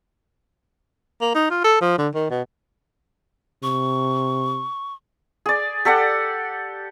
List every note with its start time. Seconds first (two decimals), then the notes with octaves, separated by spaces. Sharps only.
1.21 A#3
1.35 D#4
1.50 F4
1.64 A4
1.81 F3
1.98 D3
2.14 D#3
2.31 B2
3.63 C3 C#6
5.46 G#4 D5
5.85 G4 A4 D5 F#5